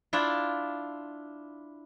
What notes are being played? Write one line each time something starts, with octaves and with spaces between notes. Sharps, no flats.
D4 E4 F4